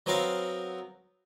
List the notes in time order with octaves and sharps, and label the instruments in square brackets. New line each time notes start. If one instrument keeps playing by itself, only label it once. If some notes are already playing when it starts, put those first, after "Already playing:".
[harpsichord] F#3 B3 C4 A#4 F5